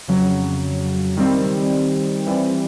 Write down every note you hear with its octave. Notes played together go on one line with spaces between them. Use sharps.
F2 C#3 F#3
D#3 G3 C4
E3 G3 C4